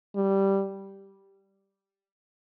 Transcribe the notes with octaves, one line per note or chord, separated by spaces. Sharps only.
G3